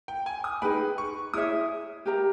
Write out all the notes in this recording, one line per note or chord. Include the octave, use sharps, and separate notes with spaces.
G5
G#5
D#6
D#4 G#4 B4 G5 B5
C#6
E4 G#4 C#5 E5 D#6
G4 A#4 E5 A#5